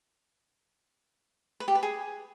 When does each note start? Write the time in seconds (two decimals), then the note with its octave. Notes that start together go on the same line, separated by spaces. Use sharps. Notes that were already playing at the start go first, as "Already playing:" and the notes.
1.60 B4
1.68 G4
1.75 B4
1.83 G#4